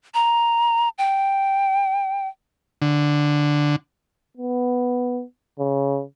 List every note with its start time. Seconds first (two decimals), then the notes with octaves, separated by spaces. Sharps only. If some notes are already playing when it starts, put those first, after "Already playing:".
0.14 A#5
0.98 G5
2.82 D3
4.37 B3
5.59 C#3